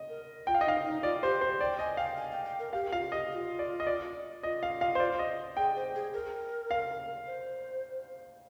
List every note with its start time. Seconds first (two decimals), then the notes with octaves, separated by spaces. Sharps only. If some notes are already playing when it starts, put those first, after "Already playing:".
Already playing: D#5
0.09 A#4
0.47 F4 G5
0.55 F5
0.61 D#5
0.65 D#4 F5
0.85 D#4
1.03 F4 D5
1.23 G4 C5
1.41 C5
1.60 D5 G5
1.79 D#5 G#5
1.97 F5 G5
2.17 G#5
2.31 G5
2.45 G5
2.59 A#4
2.73 G4 F5
2.92 F4 F5
3.12 G4 D#5
3.30 G4
3.35 F4
3.59 D5
3.80 D#5
3.87 D5
4.43 F4 D#5
4.63 F5
4.81 F5
4.95 C5
5.00 D5
5.19 D#5
5.57 G#4 G5
5.76 C5
5.95 G#4
6.14 A#4
6.71 F5
7.27 C5